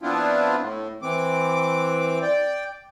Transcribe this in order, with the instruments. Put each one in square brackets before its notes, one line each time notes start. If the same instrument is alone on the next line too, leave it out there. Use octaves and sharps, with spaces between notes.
[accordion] F3 B3 C4 D4 E4 F4
A2
E3 C4 D6
D5 G5